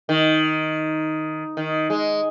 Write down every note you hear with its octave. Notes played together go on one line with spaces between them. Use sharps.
D#3
D#3
G#3